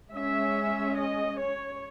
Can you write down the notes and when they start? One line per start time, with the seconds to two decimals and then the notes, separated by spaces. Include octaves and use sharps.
0.13 G#3 C#4 E5
0.95 D#5
1.36 C#5